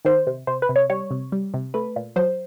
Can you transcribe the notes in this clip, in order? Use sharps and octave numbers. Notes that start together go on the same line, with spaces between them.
D#3 C5
C3
C3 C5
B4
C3
C#5
G3 C#5
C3
G3
C3
A3 B4
A#2
F#3 C5